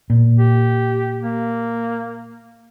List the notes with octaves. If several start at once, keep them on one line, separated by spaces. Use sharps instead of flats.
A#2
G4
A#3